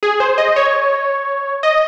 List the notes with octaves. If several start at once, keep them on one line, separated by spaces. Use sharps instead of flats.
G#4
C5
D#5
C#5
D#5